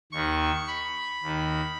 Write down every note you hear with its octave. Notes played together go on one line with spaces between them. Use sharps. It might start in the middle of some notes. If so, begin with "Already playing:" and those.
D#2 D#3 C#6
B5
D#2 D#3